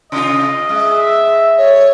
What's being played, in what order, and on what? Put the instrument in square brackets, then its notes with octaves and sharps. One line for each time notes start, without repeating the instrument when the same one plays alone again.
[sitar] C3 F4 [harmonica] D#5
[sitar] G#3 [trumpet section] E5
[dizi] C#5